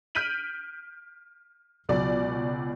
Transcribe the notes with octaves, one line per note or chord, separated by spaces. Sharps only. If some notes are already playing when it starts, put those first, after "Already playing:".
F6 G6 B6 D7 D#7 F#7
C#2 B2 F#3 D5